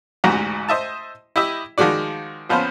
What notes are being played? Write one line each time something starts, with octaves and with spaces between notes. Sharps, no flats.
A1 D2 G#2 F#4 A#5
C5 D#5 E5 A5
E4 G4 D#5 E5
D#3 F3 G#3 F#4 D5
A#1 F3 B3 C#4 C5 F6